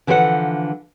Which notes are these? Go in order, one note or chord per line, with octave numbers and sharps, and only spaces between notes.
D3 E3 F3 A4 B4 F#5